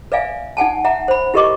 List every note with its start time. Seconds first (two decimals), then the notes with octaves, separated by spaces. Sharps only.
0.12 B4 D5 E5 F5 G#5
0.57 D#4 F#5 G#5 A5
0.84 E5 F#5 A#5
1.08 C5 B5
1.34 E4 G4 A#4 D#5 C#6 D6